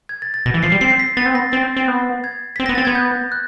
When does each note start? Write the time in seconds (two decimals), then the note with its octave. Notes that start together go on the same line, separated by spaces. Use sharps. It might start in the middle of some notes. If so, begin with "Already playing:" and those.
0.09 G#6
0.22 A6
0.34 A6
0.46 B2 A#6
0.54 E3
0.63 F3 C7
0.72 G3
0.81 C4 C7
0.99 B6
1.17 B3 A6
1.26 C4
1.34 B3 A#6
1.52 C4 A6
1.77 C4
1.88 B3
2.24 G#6
2.56 C4 B6
2.66 B3 A#6
2.75 C4 A6
2.85 B3 G#6
2.95 G6
3.32 F#6